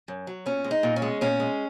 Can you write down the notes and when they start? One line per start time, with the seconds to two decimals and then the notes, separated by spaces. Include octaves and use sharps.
0.08 F#2
0.27 F#3
0.46 A#2 C#4
0.64 G#3
0.71 D#4
0.83 A#2
0.96 C#4
1.02 G#3
1.21 A#2 C#4
1.40 G#3